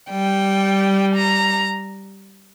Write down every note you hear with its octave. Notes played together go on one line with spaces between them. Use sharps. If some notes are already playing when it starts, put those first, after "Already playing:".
G3 G5
A#5